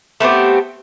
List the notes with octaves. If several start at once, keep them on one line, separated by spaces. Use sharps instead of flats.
A3 B3 C4 G4